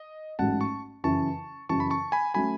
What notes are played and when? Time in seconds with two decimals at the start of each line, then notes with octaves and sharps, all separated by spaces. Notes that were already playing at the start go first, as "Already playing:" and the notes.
Already playing: D#5
0.39 A1 G#2 F#3 A3 F#5 A5
0.60 A5 C#6
1.04 F#2 C#3 E3 A5 C#6
1.69 F#2 C#3 E3 A5 C#6
1.80 B5
1.90 A5 C#6
2.12 G#5 B5
2.34 F#3 A3 C#4 G#5 B5